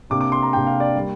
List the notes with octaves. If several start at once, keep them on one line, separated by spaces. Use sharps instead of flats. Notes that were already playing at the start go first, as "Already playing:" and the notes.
C3 A#3 D4 D6
D6
C6
A#5
C3 A#3 D4 G5
F5
D5
G3 A#3